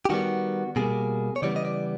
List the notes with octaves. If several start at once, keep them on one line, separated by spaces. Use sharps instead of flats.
G4
D#3 G3 B3 F#4
B2 G3 A#3 G#4
C#5
C#3 E3 G3 B3 D5
D#5
D5